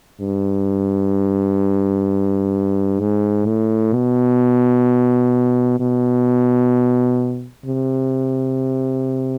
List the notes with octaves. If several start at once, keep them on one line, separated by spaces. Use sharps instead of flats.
G2
G#2
A2
B2
B2
C3